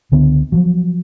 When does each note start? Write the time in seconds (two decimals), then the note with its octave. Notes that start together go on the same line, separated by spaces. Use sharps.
0.12 C#2 D3 B3
0.52 F3 F#3